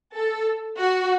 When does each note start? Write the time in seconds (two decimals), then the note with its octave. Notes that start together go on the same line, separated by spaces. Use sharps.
0.14 A4
0.79 F#4